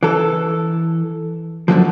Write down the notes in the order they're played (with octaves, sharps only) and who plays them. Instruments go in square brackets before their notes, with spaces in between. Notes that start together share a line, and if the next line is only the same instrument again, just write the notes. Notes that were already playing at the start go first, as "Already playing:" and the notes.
[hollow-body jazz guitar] E3 A4
F#2 D3 E3 F3